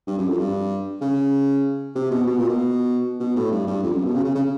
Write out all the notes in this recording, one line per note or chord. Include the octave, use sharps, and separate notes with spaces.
G2
F#2
F2
G2
C#3
C3
B2
B2
A#2
B2
B2
A2
G2
G2
F2
F#2
B2
C#3
C#3
C#3